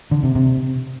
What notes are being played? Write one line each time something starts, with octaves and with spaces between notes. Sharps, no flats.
D3
C3
C3